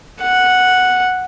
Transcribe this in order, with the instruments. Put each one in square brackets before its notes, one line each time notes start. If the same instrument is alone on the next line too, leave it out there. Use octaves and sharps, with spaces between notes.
[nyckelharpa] F#5